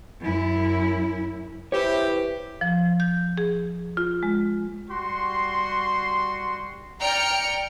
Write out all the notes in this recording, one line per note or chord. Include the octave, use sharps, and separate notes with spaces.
F#2 E4
E3 E4 G4 C5 C#5
F3
G6
G#4
F4
G#3
G3 F#4 C6
D5 G5 A#5 F6 C#7